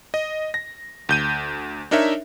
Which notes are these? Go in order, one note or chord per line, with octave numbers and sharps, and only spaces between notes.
D#5
A#6
D2 G6 D#7
D4 D#4 A#4 C#5 E5